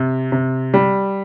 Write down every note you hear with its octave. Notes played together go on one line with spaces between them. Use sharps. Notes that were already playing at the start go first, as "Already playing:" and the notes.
Already playing: C3
C3
G3